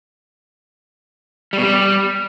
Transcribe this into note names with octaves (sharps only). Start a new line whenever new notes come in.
G3
B2
G3